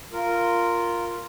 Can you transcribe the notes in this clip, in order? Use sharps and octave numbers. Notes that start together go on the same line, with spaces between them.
F4 A#4